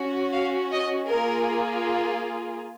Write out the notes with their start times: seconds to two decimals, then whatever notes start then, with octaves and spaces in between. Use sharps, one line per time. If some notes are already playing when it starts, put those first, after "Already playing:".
Already playing: C#4 F#4
0.32 F5
0.71 D#5
1.08 A#3 F4 G#4 A#4